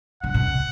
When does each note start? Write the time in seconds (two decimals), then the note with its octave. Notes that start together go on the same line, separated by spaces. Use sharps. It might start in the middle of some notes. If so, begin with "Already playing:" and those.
0.23 C#3 F#5
0.34 B2